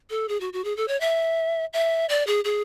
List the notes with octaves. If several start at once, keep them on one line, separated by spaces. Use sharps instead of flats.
A4
G#4
F#4
F#4
G#4
A4
C#5
E5
E5
D5
G#4
G#4